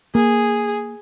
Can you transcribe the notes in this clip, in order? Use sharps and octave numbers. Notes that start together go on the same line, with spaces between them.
A#3 G#4